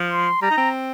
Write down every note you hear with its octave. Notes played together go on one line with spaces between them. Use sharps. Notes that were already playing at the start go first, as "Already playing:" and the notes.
Already playing: F3
C6
G3 A#5
D#4
C4